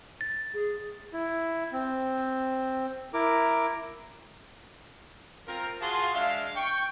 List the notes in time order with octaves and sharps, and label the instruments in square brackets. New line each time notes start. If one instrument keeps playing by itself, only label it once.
[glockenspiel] A6
[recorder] G#4
[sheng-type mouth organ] E4
C4
E4 A#4 D6
[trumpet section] C4 F4 A#4
F4 F#4 G#4 F5 A5 C6
G#3 D4 E5 F5
G5 C#6